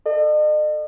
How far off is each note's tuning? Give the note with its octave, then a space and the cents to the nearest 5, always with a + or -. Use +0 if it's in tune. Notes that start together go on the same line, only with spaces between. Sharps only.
A4 +0 D#5 -45